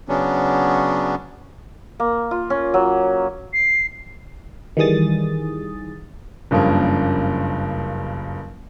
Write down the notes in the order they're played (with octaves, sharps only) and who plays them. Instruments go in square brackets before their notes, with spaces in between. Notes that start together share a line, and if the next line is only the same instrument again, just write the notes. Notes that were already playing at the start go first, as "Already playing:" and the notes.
[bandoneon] C#3 F#3 B3 C#4 D4
[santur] A#3
F4
C#4
F#3
[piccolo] C7
[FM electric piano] D#3 E3 G3 G#4 D#6 A6
[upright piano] F#1 G2 C#3 F3 A#3